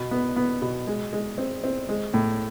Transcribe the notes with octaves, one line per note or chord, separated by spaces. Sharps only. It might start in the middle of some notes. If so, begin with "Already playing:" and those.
Already playing: B2
B3
B3
B2
G#3
G#3
C4
C4
G#3
A2